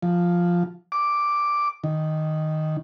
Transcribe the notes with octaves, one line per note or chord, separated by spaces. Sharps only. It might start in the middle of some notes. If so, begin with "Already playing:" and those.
F3
D6
D#3